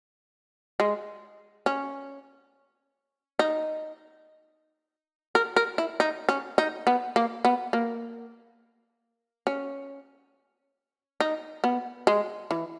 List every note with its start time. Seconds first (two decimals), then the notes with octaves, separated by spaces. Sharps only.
0.80 G#3
1.66 C#4
3.39 D#4
5.35 A#4
5.56 A#4
5.78 E4
6.00 D#4
6.29 C#4
6.58 D#4
6.87 B3
7.16 A#3
7.45 B3
7.73 A#3
9.47 C#4
11.20 D#4
11.64 B3
12.07 G#3
12.51 E3